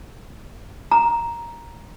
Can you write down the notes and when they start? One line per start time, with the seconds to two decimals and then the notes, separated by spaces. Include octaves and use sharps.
0.91 A#5